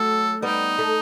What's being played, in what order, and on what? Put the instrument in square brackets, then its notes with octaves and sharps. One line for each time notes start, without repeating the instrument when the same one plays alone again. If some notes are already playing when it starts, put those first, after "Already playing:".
Already playing: [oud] F#3 A3 [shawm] A4
[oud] G3 B3 [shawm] D#4
[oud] A3